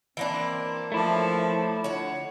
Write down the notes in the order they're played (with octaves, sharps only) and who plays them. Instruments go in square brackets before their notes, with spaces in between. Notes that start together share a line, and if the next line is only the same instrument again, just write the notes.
[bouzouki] E3 A#3 D4 [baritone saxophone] C4 [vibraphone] D#5 B5
[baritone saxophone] F3 [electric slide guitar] A3 E4 [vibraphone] C#5 A5 D6
[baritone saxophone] D3 [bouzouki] C#5 F#5 [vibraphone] D#5